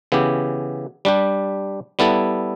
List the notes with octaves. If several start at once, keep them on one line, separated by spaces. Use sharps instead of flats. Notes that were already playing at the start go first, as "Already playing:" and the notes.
C#3 E3 B3 E4 G4
G3 D4 G4
G3 B3 E4 A4